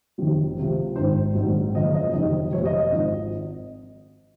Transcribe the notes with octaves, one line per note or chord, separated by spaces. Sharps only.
F1 F2 C3 D#3 F#3
C#2 C3 F3
G#1 G#2 D#3 C5
A#1 G#2 F#3
F#1 F#2 C#3 F3 D#5
D#5
F#1 F2 C3 D#3 F#3 D#5
F2 C3 F#3 C#5
D#5
D#5
G#1 G#2 F3